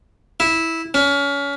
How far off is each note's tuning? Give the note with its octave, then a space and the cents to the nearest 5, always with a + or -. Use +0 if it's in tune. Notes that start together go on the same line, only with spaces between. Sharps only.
E4 -10
C#4 +30